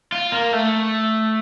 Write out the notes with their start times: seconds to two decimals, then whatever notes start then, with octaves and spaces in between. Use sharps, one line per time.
0.12 F4
0.32 A#3
0.53 A3